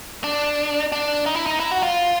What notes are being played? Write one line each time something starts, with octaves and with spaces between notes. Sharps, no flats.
D4
D4
D#4
E4
D#4
E4
F#4
F4